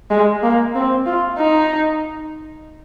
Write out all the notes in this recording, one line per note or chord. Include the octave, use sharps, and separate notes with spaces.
G#3
A#3
C4
F4
D#4